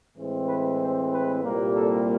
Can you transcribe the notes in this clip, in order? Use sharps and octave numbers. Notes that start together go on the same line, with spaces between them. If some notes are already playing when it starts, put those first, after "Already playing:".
A2 E3 G#3 C4
B4
C5
B4
C2 A#2 G3 A#3
A4